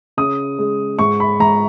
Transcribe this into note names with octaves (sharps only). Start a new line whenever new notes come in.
C#3 D#6
G#3
G#2 C#6
B5
G#2 A#5